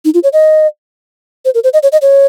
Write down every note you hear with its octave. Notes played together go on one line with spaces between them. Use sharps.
D#4
F4
C#5
D#5
C5
A#4
C5
D#5
C#5
D#5
C#5